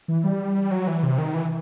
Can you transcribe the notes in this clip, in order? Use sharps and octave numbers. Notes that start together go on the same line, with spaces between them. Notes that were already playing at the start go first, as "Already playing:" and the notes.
E3
G3
F#3
E3
C3
D#3
E3